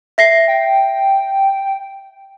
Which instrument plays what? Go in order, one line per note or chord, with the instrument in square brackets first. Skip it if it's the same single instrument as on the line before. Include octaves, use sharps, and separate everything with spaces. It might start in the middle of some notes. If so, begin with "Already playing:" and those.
[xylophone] E5 A#6 C7
[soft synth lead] G5